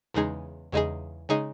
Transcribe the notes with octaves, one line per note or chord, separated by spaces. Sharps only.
E2 C#3 G#3 D#4 G#4
E2 C#3 G#3 D#4 G#4
C#3 G#3 D#4 G#4